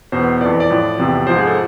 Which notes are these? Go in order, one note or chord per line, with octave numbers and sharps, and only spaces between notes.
E2 B2 C5
F2 E3 D5
D5
A2 F3
E2 C3 F3
G#2 F3 C5
G#4
A4